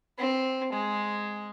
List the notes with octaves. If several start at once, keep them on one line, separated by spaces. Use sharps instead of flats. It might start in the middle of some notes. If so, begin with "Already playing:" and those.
C4
G#3